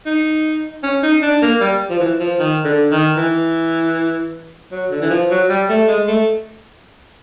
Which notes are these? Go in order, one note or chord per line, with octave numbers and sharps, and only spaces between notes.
D#4
C#4
D#4
D4
A#3
G3
F3
E3
F3
D#3
D3
D#3
E3
F#3
D3
E3
F3
F#3
G3
A3
G#3
A3